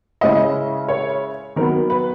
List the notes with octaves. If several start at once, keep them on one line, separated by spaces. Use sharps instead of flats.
C#3 G#3 C#4 E4 D#5
C#5
D#3 F#3 B3 A#4
B4